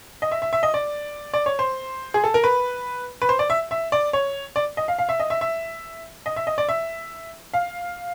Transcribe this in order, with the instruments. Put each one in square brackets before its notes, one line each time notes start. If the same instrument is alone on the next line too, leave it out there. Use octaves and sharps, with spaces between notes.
[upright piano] D#5
E5
E5
E5
D#5
D5
D5
C#5
C5
G#4
A4
A#4
B4
B4
C5
D5
E5
E5
D5
C#5
D5
D#5
F5
F5
E5
D#5
E5
E5
D#5
E5
D#5
D5
E5
F5